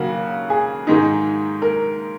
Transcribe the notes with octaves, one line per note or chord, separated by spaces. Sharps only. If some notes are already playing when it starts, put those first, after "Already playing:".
Already playing: D#2 C#3 F#3 A#3 F#4
G#4
G#2 D#3 G#3 D#4
A#4